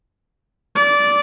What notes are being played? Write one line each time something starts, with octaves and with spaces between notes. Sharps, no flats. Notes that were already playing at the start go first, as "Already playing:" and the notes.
D5